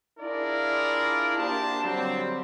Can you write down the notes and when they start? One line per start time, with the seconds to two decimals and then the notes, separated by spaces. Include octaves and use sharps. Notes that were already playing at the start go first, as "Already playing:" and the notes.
0.19 D4 E4 F4 G#4 A#4 D5
1.36 A#3 D4 G4 C5 A5
1.83 D3 F#3 G3 C4